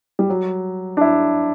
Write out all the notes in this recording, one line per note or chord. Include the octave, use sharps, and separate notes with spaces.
G3
F#3
D4
E4